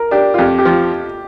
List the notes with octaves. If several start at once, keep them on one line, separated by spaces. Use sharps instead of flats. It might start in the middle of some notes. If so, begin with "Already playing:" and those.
Already playing: A#4
D4 G4
F4
F2 G4
G4
F3